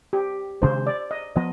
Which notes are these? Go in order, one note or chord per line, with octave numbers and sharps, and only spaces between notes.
G4
C3 D#3 G#3 D4 C5
D5
D#5
F3 B3 D#5